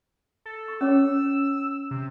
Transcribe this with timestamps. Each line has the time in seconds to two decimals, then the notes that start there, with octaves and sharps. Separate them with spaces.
0.46 A4
0.68 C#6
0.81 C#4 C#5 D6 E6
1.91 C3